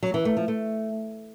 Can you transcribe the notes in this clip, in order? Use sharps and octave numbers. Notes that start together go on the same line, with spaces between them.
F#3
E3
A3
F3
A3